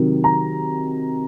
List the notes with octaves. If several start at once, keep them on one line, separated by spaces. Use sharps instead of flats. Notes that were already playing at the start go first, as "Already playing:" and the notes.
Already playing: C3 D#3 F#3
A#5